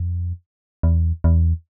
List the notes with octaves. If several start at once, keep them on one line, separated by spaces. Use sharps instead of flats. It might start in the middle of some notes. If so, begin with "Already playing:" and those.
Already playing: F2
E2
E2